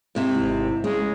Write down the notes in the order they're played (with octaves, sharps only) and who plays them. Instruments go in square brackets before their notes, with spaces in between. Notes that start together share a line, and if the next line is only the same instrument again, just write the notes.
[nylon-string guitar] G#2 C3 E4
[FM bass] G#1
[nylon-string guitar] C#3 [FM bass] G#3